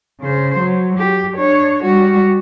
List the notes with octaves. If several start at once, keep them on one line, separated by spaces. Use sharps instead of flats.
C#3 C5
F#3
G4
D4 C#5
G3 F#4